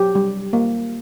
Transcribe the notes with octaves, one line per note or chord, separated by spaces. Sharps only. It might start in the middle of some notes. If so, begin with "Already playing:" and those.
Already playing: F#3 G4
G3
A#3